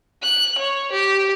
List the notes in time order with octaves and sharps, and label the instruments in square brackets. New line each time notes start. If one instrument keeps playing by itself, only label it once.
[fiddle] F#6
C#5
G4